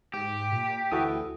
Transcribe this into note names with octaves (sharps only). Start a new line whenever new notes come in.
G#2 G4
A#2
D2 E3 F#4 A4 D#6